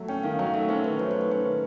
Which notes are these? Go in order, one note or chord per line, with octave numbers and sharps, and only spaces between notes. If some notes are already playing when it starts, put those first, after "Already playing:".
Already playing: F#3 A3
C#4 G5
D#3 F5
F#3 F5
A3 E5
C#4 C5
D#3 B4
F#3 C#5
A3 C5
B4
C#4 C5
D#3